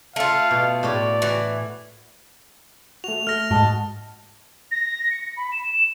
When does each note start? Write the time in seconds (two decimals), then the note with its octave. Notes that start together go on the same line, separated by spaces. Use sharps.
0.16 A3 F4 F5
0.51 B2
0.83 A2 A4 C#5 D5
1.22 E3 F#4
3.04 A3 F#4 F7
3.27 A3 F6 A#6
3.51 G#2 F#4 D#5 F#5 A5
4.71 A#6
5.11 C#7
5.37 B5
5.52 E7
5.69 E7